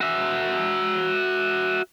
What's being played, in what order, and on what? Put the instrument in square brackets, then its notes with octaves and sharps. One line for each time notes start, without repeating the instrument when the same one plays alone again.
[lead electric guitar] F#4 E5